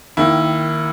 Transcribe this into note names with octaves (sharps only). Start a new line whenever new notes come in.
D#2 D#3 E4